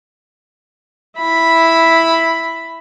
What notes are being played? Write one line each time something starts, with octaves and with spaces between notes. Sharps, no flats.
E4 B5